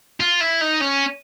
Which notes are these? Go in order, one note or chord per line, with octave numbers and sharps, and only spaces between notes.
F4
E4
D#4
C#4